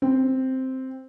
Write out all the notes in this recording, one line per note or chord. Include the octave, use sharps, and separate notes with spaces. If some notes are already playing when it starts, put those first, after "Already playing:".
C4